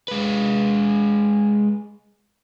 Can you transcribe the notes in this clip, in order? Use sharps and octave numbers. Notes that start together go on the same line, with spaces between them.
G#3 B4